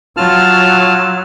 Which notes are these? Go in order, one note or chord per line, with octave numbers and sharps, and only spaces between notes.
F#3 F4 A5 F6